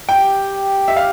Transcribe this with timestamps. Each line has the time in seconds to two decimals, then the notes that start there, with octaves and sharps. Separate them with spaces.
0.09 G4 G5
0.88 E5
0.96 F5